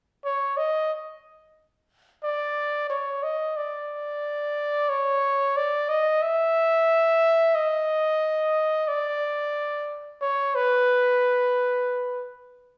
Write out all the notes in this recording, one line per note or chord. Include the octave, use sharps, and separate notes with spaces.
C#5
D#5
D5
C#5
D#5
D5
C#5
D5
D#5
E5
D#5
D5
C#5
B4